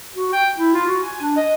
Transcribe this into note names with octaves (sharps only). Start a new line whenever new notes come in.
F#4
G5
E4
F4
F#4
G#5
D4
D#5